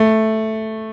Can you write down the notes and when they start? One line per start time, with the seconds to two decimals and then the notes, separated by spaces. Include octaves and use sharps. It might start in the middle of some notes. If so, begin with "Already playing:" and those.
Already playing: A3